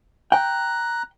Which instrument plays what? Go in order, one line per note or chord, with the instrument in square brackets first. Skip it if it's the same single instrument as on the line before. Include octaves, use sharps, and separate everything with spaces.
[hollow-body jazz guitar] G5 [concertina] A#5 F#6